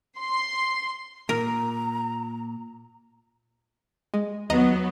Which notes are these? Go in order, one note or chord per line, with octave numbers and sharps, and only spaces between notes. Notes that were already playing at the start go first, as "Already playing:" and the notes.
C6
A#2 A#4 A#5
G#3
D#2 F#3 B3 D#5 A#5